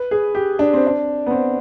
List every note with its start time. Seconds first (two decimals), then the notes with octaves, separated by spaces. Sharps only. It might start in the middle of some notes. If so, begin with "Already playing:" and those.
Already playing: B4
0.11 G#4
0.35 G4
0.59 D4
0.74 C4
0.87 D4
1.26 B3
1.31 C4